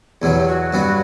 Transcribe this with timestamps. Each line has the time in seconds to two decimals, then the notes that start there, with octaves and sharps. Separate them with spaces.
0.22 E2 B2 F#3 E4
0.36 G4
0.47 F#4
0.73 G2 F#3 B3